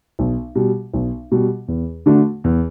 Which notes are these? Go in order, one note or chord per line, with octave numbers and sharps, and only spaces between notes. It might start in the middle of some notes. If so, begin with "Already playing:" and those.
B1
B2 G3
B1
B2 G3
E2
D3 A3 D4 F#4
E2